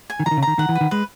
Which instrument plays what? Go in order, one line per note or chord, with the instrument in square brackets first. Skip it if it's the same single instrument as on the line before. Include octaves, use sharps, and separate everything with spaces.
[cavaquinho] G#5
[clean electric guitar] D#3
[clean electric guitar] E3 [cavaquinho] A#5
[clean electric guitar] D#3
C#3
[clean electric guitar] D#3 [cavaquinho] A#5
[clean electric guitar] D#3 [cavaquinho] F#5
[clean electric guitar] E3
[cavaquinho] B4
[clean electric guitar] D#3
[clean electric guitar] G#3 [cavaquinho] B4